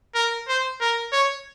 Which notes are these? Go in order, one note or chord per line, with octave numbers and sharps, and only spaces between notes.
A#4
C5
A#4
C#5